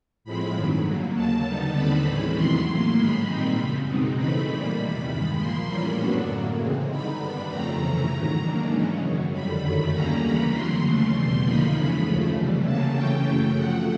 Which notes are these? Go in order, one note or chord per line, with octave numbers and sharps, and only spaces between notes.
A2 F3 G#3 C4 B5
G2 D#3 F#3
D3 F#3 A#3
D#2 C#3 F#3 A5
D3 G3 B3 D#4
D#2 D3 G3 C4 D#4 B5
A2 E3 G#3 C#4
E2 C3 D#3 F#3 C6
A2 F#3 A#3
G#2 D#3 G#3 B5
A#2 G3 C4 D#4
F#2 C#3 F3
B2 G#3 C4 D#4
C#3 E3 A3 C4 D#4 B5
A#2 G3 A#3
E2 C3 D#3 G3
G2 D#3 G#3
A#2 F3 A#3 C6
A2 E3 G3 A#3 C#4 B5
F#2 D3 F#3 B3 D4
A2 F#3 A#3
C#3 E3 G#3 C4
D3 G3 B3 D#4 B5
G2 D#3 G3 B3 D4
F2 C#3 F3 A3 C4 A#5
C3 E3 A3 C#4
G#2 D#3 F#3
G#2 D#3 F#3 A#3 D4
C#3 E3 G#3 C#4
F#2 D#3 F#3
F2 D3 G3 B5
F#2 D#3 F#3 A3
D#2 D3 G3 A#3 C#4 A#5
C#3 E3 G3 A#3 C#4 B5
F2 D3 F#3 C6
D#2 C#3 E3 A3 C#4
E2 B2 G3 C6
D3 F3 A#3 D#4 B5
F#2 C#3 E3 G#3
D#2 C#3 F3 A3
C3 E3 G3
C#3 F#3 A#3 C#4 A5
C#3 E3 A3 C#4 G5
F#2 C#3 F#3 A3 G5
C3 F3 A3 F#5